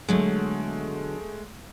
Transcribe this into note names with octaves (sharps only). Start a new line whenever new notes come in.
B2 D3 F#3 G#3 A3